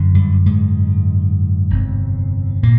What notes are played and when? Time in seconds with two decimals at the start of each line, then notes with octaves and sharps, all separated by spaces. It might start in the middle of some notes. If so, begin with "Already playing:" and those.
Already playing: G1 F#2 D3
0.15 G2 G3
0.46 G#2 G#3
1.70 G1 F2 C3
2.63 A#2 A#3